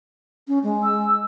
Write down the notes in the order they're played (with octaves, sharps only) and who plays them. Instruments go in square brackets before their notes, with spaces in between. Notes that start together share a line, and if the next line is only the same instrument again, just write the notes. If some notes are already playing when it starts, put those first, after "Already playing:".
[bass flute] C#4
G#3
[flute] E6